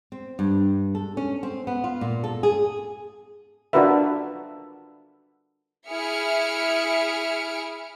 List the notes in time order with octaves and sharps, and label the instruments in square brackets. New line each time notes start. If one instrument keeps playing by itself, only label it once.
[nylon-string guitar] C4
G2
A4
C#4
C4
B3
F4
A#2
A4
G#4
[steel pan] D4 F4 F#4 A#4 B4 E5
[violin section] E4 G#4 E5 F6 C#7 D7